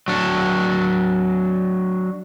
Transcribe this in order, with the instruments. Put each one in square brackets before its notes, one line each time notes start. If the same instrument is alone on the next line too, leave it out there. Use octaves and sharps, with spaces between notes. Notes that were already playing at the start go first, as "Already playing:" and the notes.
[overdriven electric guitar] F#3 D4